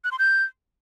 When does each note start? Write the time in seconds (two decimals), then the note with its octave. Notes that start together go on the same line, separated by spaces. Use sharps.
0.04 F#6
0.12 C6
0.19 G6